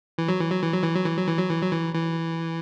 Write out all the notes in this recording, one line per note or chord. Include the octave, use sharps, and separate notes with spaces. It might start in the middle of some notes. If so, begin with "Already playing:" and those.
E3
F#3
E3
F#3
E3
F#3
E3
F#3
E3
F#3
E3
F#3
E3
F#3
E3
E3